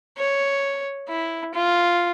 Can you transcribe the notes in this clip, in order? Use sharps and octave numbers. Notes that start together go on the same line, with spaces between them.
C#5
E4
F4